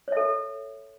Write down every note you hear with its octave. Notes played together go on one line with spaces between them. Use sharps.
A4 C#5 E5